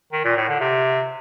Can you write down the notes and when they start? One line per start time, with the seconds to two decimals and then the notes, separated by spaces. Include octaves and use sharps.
0.13 D#3
0.25 A#2
0.37 A2
0.48 D3
0.60 C3